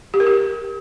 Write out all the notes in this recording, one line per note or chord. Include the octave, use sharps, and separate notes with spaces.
G4
A#4
G4